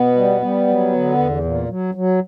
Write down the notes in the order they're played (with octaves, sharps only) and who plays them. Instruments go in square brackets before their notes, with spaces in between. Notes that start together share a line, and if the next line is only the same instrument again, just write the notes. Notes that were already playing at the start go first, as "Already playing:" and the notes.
Already playing: [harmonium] B2 B3
G3
G3
F#3
D3
E2
A#2
F#3
F#3